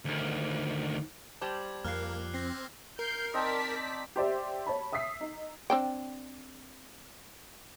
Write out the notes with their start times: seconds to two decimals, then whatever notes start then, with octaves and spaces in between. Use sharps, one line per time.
0.05 D2 D#3
1.42 G3 C5 A5 D6 G#6 F#7
1.85 F2 F3 A#3 F6 F#6 C7
2.34 C4 A#6 C7
2.99 A#4 G6 C7
3.34 C4 D#4 D5 A5 B6
4.16 G4 C5 D5 E5
4.67 C#5 A5 B5
4.92 E5 D#6 E6 B6 C7
5.21 D#4
5.70 C4 D4 G5